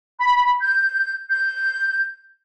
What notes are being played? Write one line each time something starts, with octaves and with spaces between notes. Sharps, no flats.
B5
G6
G6